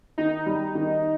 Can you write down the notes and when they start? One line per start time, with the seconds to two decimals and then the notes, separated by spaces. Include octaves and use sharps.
0.18 D#3 D#4
0.46 G3
0.75 D#3